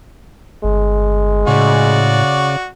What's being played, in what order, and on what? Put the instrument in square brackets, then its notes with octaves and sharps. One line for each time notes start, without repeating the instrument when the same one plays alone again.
[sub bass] G1 [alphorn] G#3
[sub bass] A2 [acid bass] C#3 [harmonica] F#4 D5